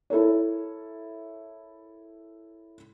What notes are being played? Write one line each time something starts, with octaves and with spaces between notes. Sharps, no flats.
E4 A4 A#4 C#5